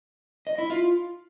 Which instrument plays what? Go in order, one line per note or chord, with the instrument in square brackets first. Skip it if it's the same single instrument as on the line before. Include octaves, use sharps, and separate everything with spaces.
[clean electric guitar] D#5
E4
F4